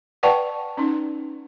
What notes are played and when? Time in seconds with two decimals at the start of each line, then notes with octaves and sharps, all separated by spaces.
0.23 B4 D5 F#5 G5 A5 C#6
0.77 C#4 D#4